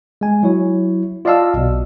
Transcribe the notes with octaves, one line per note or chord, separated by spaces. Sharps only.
G#3 G#5
F#3 E4 C#5
F4 D5 D#5 F5 A5 E6
B1 B2